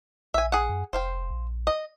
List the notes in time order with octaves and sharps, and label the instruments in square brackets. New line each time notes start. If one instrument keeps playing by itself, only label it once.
[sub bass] A#1 [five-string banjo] E5 G#5
[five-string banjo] G#4 F#5
[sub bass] F#2
[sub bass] F1 [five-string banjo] C5 F5 G5
[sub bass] A#1
[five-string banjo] D#5